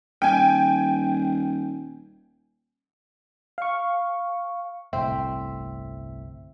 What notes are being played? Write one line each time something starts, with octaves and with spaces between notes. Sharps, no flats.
D#1 G5 G#5
F5 C#6
G1 C2 A2 C4 E5